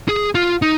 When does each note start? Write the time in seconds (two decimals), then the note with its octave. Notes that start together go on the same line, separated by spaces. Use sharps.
0.09 G#4
0.35 F4
0.62 D#4